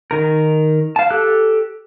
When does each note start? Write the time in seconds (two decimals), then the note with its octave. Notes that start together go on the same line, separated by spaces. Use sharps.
0.11 D#3 A#4
0.96 F5 A5
1.10 G4 A4 F#6